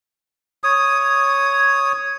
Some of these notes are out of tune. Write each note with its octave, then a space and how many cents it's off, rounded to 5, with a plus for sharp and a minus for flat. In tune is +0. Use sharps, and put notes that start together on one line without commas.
C#5 +0 D#6 +0